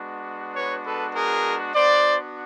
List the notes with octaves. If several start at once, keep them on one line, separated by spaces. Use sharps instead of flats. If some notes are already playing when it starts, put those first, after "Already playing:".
Already playing: G#3 B3 D4 F#4
B4 C#5
A4 B4
G#4 A#4
B3 D4 F#4 C5 D5